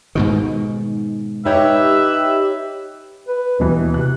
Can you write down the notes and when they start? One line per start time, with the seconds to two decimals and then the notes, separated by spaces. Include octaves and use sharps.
0.15 G#2 B2 D#3
1.45 D#4 G4 B4 C#5 D#5 E5
3.27 B4
3.60 D#2 B2 E3
3.94 C3 F#6